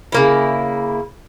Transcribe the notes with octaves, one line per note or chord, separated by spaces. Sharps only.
C#3 A#3 E4